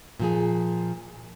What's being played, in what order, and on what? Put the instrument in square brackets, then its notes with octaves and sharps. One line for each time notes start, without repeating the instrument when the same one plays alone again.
[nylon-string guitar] A#2 F3 G#4